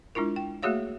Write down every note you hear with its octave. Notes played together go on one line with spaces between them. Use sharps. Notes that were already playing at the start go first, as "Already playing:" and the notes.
G#3 D4 E4 F4 A#4
G5
A3 A#3 F#4 G#4 C#5 F5